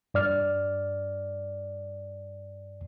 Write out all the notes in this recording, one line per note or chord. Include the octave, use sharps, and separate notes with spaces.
G2 D5 F6